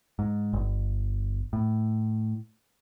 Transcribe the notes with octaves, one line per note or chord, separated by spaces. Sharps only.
G#2
G1
A2